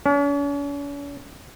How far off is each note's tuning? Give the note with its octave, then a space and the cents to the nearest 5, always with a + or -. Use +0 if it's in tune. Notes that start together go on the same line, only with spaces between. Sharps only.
C#4 +45